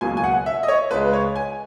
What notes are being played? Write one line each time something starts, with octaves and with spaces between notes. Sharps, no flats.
C#2 B2 F#3 A#3 C#4 G#5
G#5
F#5
E5
D#5
C#5
C#2 C#3 G#3 B4
C#5
G#5